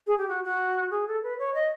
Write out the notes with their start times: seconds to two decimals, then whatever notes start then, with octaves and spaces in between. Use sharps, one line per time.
0.07 G#4
0.18 G4
0.29 F#4
0.44 F#4
0.91 G#4
1.07 A4
1.23 B4
1.39 C#5
1.55 D#5